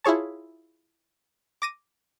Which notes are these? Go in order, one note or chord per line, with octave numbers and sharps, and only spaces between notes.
E4 F4 G#4 C#5 A5
D6 A#6 D#7